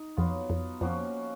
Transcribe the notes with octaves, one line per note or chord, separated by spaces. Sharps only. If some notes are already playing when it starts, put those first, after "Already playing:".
Already playing: D#4
F2 F#3 B3 F4
F2
F2 F3 A#3 C#4 F#4